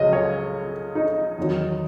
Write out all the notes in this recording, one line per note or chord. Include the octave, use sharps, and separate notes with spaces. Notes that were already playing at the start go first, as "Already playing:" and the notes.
Already playing: C#2 C#3 F#3 D#5
C#5
D#4
E2 D#3 F#3